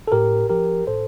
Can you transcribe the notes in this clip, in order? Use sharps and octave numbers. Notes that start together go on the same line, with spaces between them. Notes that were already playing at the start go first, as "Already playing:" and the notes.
A4
A2 G4 A#4
F3 G4 A#4
A2 A4 C5